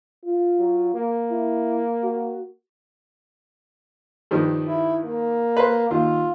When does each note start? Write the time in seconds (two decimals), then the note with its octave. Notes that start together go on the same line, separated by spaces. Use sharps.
0.24 F4
0.58 F#3
0.94 A#3
1.31 E4
2.03 F#4
4.31 G2 D#3 F3
4.68 E4
5.05 A#3
5.57 B4 C5
5.91 D#2 F4